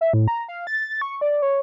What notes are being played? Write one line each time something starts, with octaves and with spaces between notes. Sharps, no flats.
E5
A2
A#5
F5
A6
C#6
D5
C#5